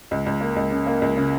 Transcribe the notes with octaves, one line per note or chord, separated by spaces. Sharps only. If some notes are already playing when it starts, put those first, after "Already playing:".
C#2
C#2
A#3
C#2
C#3
A#3
C#2
C#3